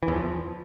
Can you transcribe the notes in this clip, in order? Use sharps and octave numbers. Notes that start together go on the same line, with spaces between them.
E3
E2
F3